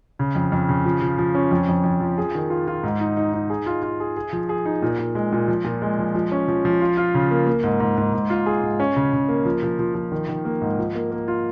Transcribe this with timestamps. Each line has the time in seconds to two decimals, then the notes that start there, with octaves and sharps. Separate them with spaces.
0.19 C#3
0.35 F2
0.52 F2
0.69 C#3
0.85 F3
1.02 F3
1.18 F3
1.35 C#4
1.51 F2
1.68 F2
1.84 F2
2.00 F3
2.18 G#4
2.35 D#3
2.50 F4
2.67 F4
2.83 G#2
3.00 D#4
3.17 D#4
3.33 D#4
3.50 G#4
3.66 F4
3.83 F4
4.00 G#4
4.17 G#4
4.33 F3
4.49 G#4
4.66 D#4
4.82 A#2
4.99 A#2
5.15 G#3
5.32 A#2
5.48 F3
5.64 A#2
5.82 G#3
5.99 F3
6.15 F3
6.32 C#4
6.48 F3
6.65 F3
6.81 F4
6.97 F4
7.14 C#3
7.31 A#3
7.47 A#3
7.63 G#2
7.80 G#2
7.97 G#2
8.13 G#2
8.30 F4
8.46 G#4
8.63 G#2
8.80 C#4
8.96 C#3
9.13 C#3
9.29 A#3
9.45 F3
9.63 F3
9.79 F3
9.95 F3
10.12 D#3
10.29 D#3
10.45 A#3
10.61 G#2
10.79 F3
10.95 A#3
11.12 A#3
11.28 F4